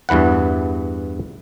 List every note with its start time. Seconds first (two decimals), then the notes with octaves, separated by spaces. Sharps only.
0.09 E2 G2 E3 B4 F#5